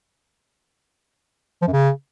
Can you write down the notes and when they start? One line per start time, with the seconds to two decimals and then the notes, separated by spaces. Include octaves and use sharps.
1.62 F3
1.67 F#2
1.73 C#3